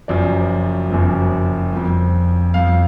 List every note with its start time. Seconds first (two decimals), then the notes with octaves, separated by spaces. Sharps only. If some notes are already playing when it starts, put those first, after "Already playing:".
0.08 F#1 F#2 F3 D5
0.90 F#1 F#2 F3
1.73 F2 F3
2.54 F2 F3 F5